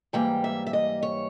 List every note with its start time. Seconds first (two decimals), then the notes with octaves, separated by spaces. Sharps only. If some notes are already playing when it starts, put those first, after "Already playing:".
0.13 G#2 E3 G3 A#3 G5
0.44 E5
0.67 E5
0.73 D#5
1.03 C#5